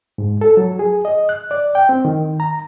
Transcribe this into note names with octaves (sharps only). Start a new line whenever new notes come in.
G#2
A4
F#3
G#4
D#5
F#6
D5
G5
C4
D#3
A#5